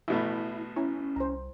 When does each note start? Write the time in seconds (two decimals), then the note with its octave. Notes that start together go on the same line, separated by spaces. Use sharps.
0.08 A1 B2 A3 E4
0.76 C#4 E4 A#5
1.16 C2 C5 A#5